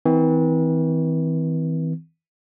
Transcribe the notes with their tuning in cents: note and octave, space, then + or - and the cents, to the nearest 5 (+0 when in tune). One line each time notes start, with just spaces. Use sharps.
E3 -35 C4 -35